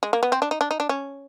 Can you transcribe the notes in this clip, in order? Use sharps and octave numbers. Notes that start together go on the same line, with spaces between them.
G#3
A#3
B3
C4
D4
D#4
D4
D#4
D4
C#4